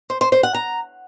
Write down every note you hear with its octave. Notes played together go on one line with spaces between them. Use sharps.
C5
C5
C5
F#5
A#5